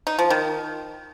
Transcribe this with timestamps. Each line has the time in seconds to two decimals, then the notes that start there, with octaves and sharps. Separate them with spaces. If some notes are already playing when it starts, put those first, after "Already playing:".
0.07 D#4
0.19 F3
0.30 D#3